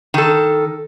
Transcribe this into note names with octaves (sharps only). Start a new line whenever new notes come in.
D#3 A4